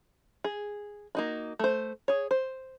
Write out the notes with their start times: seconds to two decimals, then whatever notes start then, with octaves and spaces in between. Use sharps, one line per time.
0.44 G#4
1.15 A#3 D#4 F#4
1.59 A3 C5
2.08 G#4 C#5
2.31 C5